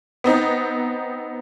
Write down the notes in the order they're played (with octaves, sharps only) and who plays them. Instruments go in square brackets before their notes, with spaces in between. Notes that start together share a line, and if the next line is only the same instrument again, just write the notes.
[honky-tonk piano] B3 C4 D#4